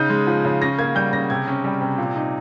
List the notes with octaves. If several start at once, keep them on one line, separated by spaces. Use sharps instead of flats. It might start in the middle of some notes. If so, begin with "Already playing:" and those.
Already playing: C#3 D#4 G6
G#3
F3
C#3
C#4 A#6
A#3 G#6
G3 G6
C#3 A#6
C3 G#6
C#4
G3
C3
A#2
D#4